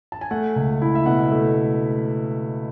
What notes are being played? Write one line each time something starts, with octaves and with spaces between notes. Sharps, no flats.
A5
G#5
A3 F#5
C#2
E4
E5
B2 F#5
A3